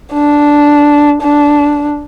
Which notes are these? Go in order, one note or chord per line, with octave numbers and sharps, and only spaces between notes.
D4
D4